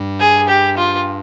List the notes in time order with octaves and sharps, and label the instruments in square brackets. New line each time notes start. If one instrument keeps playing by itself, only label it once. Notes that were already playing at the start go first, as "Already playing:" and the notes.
Already playing: [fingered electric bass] G2
[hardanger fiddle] G#4
G4
F4